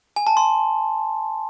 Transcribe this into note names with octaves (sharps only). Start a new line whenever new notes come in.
G#5
A5
C6